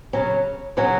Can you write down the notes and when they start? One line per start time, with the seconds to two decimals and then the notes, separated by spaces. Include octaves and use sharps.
0.13 C#3 F#3 C#4
0.77 C#3 F#3 C#4